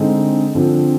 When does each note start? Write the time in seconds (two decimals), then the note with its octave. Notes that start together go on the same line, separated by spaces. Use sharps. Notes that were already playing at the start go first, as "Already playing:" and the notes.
Already playing: D3 G#3 C4 D#4
0.55 D3 F3 C4